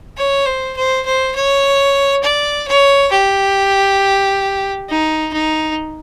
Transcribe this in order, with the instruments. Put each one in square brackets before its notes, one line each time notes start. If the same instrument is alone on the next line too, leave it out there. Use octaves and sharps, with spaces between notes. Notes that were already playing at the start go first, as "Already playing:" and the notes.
[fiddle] C#5
C5
C5
C5
C#5
D5
C#5
G4
D#4
D#4